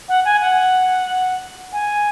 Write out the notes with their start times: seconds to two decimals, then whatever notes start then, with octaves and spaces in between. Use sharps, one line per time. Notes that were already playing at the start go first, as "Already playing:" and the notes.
0.09 F#5
0.25 G#5
0.42 F#5
1.72 G#5